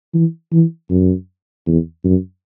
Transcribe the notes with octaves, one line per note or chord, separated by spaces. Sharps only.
E3
E3
F#2
E2
F#2